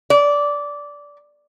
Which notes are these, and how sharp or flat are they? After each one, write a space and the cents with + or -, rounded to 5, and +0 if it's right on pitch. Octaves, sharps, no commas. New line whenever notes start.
D5 -15